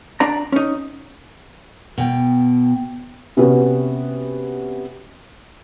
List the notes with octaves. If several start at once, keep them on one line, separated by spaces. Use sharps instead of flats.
D4 D5 A#5
C#4 D#4
B2 G5
C3 B3 C#4 F#4